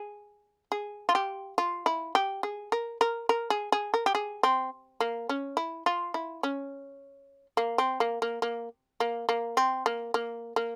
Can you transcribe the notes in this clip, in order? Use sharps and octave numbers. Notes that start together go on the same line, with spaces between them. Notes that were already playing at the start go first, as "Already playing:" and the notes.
Already playing: G#4
G#4
F4
G4
F4
E4
G4
G#4
A#4
A#4
A#4
G#4
G#4
A#4
G4
G#4
C4
A#3
C#4
E4
F4
E4
C#4
A#3
C4
A#3
A#3
A#3
A#3
A#3
C4
A#3
A#3
A#3